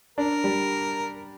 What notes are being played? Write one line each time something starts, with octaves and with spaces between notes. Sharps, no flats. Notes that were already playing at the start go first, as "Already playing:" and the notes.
D4 A#4
G3